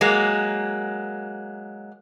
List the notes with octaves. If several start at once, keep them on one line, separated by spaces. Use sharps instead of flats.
F#3 G#3 A#3